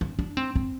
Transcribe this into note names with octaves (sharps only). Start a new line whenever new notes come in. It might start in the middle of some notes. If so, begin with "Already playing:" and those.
C4
D4
C4
C4